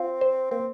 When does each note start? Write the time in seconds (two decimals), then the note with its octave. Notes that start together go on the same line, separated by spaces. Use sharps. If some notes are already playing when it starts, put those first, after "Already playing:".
Already playing: C4 F4
0.21 C5
0.51 A#3 C4